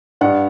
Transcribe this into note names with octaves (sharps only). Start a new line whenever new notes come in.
G2 D5 F#5